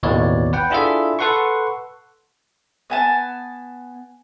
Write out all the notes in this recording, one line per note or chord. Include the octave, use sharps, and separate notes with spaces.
A1 D#2 B2 E3 C#5 D5
B4 F#5 G5
D4 E4 F4 G#4 A4 E5
A4 B4 F#5 C6 C#6
B3 G#5 A5